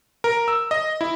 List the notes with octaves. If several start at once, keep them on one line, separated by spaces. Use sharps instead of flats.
A#4
E6
D#5
E4